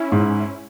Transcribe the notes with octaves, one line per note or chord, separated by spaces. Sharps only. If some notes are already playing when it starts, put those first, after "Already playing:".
Already playing: C#4 E4
G#2